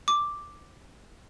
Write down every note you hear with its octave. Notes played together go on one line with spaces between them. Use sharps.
D6